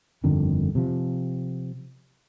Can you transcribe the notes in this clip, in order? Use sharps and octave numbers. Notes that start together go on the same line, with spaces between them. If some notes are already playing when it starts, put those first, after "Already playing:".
G1 F2 D3 D#3
C3 F3